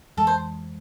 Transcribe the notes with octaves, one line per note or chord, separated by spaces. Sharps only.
F2 E3 G#3 A4
C5